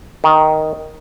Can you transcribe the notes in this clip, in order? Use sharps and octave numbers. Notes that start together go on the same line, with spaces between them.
D#3